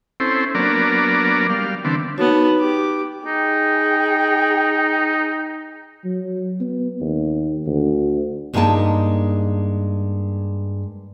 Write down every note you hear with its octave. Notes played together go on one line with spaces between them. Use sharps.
C4 C#4 E4 A4 C5
F#3 A#3 B3 D4 A#4 D5
G3 F5
D3 E3 B3 C4 D4
B3 D#4 F#4 C#5 A5
G4 D6
D#4 G#4 G5
F#3
B3
D#2
D2
G2 G#3 A#3 D#4 G5 A5